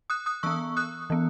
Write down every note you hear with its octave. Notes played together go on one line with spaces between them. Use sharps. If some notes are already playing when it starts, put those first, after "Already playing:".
D#6 F#6
D#6 F#6
E3 B3 C#6 E6
D#6 F#6
E3 B3